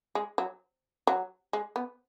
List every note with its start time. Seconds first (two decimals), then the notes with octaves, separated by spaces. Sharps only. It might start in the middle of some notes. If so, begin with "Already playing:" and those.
0.15 G#3
0.38 F#3
1.07 F#3
1.53 G#3
1.76 B3